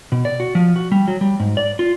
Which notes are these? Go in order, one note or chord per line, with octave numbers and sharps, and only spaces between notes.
B2
D5
F#4
F3
F#4
G3
F#3
G3
G#2
D5
F4